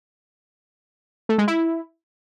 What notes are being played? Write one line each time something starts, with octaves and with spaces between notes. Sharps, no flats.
A3
G#3
E4